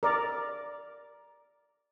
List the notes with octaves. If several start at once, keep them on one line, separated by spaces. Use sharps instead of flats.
A#4 D5